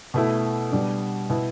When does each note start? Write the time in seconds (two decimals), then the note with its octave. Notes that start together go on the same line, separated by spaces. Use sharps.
0.14 B2 A3 E4
0.72 B2 G3 D4
1.30 B2 B3 E4